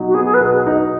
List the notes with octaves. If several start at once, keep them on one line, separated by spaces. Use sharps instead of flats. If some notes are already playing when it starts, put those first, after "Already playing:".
Already playing: B2 F#3 D#4
F#4
B3 G#4
G#4
B4
B2
G#4
D#4